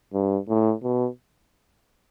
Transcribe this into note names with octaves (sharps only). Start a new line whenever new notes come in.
G2
A2
B2